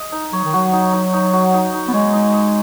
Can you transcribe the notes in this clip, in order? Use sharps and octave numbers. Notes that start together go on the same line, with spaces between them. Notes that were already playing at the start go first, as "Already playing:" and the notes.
Already playing: D#5
D#4
F#3 C#5
D#3
F#3 F#4
D#4
D#4
D#4
F#4
D#4
D#4
B3
G#3 C#5
D#4
D#4